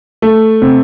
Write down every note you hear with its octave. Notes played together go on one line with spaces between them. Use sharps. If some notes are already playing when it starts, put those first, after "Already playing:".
A3
C3